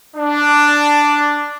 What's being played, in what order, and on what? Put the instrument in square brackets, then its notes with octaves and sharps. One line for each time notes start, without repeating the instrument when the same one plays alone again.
[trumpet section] D4